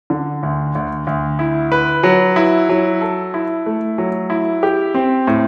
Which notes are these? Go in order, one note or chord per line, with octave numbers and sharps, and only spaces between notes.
D3
D2
D2
D2
E4
B4
F#3
E4
F#3
A4
E4
A3
F#3
E4
G4
C4
A2